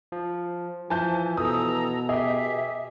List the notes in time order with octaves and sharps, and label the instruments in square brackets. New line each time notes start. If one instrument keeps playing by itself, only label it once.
[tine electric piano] F3
[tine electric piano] E3 [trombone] F3 [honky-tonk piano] G#5 A5 G6
[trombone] B2 [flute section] A4 A#5 E6 [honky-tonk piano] D#6
[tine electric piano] G4 G#4 [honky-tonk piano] D#5 [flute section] E5